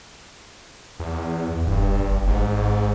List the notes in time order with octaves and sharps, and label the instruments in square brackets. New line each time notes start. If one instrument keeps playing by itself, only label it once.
[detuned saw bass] E2
[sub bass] E2
[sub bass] E1 [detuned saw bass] G2
[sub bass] G1
[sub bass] G#1 [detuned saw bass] G#2